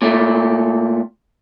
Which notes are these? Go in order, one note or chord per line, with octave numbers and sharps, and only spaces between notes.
A#2 A3